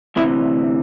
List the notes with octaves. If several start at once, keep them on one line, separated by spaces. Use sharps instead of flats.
D2 C3 E3 E4